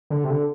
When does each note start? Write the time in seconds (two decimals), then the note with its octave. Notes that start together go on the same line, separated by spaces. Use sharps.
0.10 D3
0.24 C3
0.30 D3